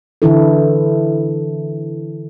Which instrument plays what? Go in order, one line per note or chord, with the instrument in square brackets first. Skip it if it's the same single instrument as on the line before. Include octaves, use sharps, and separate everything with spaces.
[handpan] D3 E3 E4 A4